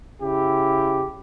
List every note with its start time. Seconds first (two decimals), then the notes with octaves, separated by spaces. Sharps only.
0.22 C#3 E4 G4